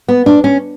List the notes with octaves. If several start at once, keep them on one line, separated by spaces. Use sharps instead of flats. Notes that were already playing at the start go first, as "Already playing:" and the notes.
B3
D4
C#4